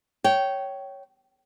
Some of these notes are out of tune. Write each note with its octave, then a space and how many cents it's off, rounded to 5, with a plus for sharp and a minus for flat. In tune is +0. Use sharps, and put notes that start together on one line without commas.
C#5 +0 G5 -20